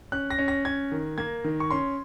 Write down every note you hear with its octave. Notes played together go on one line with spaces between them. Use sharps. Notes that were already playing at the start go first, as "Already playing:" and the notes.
C#4 F#6
A#6
C#4
A#6
C#4 G#6
D#3
A#3 G#6
D#3
C#6
C#4 C6